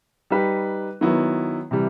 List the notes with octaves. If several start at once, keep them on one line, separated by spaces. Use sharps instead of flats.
G3 D#4 G4 B4
D#3 F#3 B3 E4
C3 E3 G3